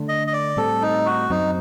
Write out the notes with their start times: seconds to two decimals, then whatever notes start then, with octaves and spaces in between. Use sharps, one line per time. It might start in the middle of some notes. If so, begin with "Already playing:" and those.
Already playing: D3 A3 D4
0.09 D#5
0.27 D#5
0.33 D5
0.57 A2 G3 C4 A4
0.82 D#4
1.06 F#4
1.30 F#2 F#3 C4 D#4